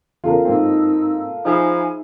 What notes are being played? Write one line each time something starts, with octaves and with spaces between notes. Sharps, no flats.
E2 C#3 F4 A4 A#4
G#2 A#3 C4 D#4 E6
F3 D#4 G#4 E5 G#5 A#5 B5